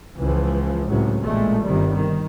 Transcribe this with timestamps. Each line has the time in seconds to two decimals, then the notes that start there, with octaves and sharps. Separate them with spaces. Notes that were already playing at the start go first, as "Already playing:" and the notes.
0.20 C#2 E3 F3
0.88 C#2 A2 C3 F#3
1.20 A1 A#2 G#3 A3
1.65 G1 C3 D#3 G3
1.94 D#3